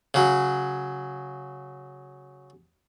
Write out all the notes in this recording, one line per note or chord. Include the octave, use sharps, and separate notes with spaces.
C#3 F#3